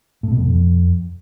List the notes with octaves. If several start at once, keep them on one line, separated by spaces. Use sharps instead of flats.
A2
B2
F2